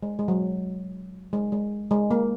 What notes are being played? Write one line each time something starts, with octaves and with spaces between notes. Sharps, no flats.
G#3
G#3
F#3
G#3
G#3
G#3
A#3